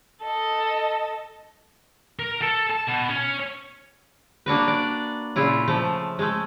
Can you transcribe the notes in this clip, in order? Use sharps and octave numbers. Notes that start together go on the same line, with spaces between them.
A4 D#5
A#4
A4
A5
B2
C#4
A#3 D4 F#4 B4
D5
A#2 C#3 E4 F4
F3 A3
G#3 A3